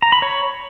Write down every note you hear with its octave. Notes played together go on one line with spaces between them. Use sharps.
A#5
B5
C#5